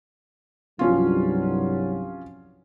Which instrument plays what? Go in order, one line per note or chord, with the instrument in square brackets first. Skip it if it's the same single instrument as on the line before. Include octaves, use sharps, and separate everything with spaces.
[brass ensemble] C2 G2 F#3 [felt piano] F3 C#4 F4